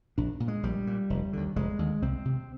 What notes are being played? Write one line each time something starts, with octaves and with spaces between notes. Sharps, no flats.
A#1 D4
A#2
G#3
A#1 G3
A#2
F1
D#2 D3
F1 G#3
D#2 D3
C2 C4
C3